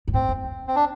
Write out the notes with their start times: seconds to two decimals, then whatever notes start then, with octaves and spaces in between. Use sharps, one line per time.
0.08 G2
0.14 A2 C4
0.29 F2
0.44 F2
0.68 C4
0.76 D4